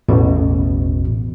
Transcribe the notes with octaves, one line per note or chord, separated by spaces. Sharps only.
A1 E2 B2